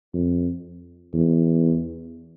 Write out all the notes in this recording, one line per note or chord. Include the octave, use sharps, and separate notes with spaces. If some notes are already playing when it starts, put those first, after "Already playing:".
F2
E2